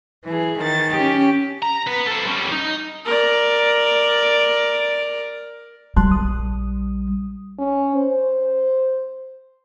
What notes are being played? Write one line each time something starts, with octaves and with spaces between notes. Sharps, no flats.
E3 G#4
D#3 A6
C#4 G4
A#5
B3 B4
A4 C5
G3 C#4
D#4
A#4 D5
G3 A5 C6 F#6
A#1 D#6
C#4
C5